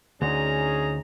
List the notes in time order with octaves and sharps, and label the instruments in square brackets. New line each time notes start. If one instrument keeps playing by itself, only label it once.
[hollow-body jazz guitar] D2 [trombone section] C#4 D#4 G#4 [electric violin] A#5